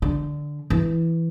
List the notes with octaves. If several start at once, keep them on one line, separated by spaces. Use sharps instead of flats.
D3
E3